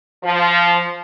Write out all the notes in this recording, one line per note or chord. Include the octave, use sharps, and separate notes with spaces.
F3